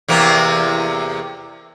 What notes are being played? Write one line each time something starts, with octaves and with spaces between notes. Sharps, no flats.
E2 C3 A#3